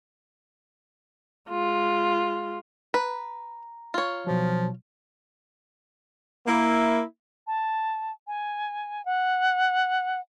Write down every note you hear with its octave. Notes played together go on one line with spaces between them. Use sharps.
G#3 F4
B4 A#5
F4 C#5
B2 F3 F#3
A#3 E4
A5
G#5
F#5